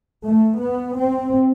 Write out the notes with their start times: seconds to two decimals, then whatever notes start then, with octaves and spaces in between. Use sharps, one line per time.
0.25 A3
0.62 B3
0.98 C4